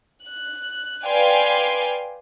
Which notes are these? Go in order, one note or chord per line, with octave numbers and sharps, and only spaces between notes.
F#6
B4 D5 F5 G5 G#5 C6